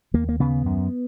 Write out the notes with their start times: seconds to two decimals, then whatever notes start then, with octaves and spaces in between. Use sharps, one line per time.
0.14 D#2 A#3
0.29 A#3
0.40 C#3 B3
0.66 F#2